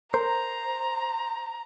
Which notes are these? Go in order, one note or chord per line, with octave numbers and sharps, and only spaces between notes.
A#4 C5 A#5